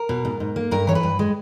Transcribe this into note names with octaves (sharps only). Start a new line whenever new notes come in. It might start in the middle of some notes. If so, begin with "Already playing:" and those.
Already playing: A#4
B2
G#2
G#2
A#3
G2 A#4
E3 C#5
B4
G2
G#3